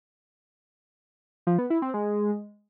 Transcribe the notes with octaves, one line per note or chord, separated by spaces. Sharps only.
F3
B3
E4
C4
G#3